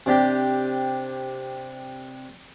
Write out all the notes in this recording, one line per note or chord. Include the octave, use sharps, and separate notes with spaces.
C3 D4 G4 G5